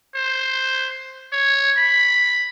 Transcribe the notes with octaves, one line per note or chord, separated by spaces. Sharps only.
C5
C#5
B5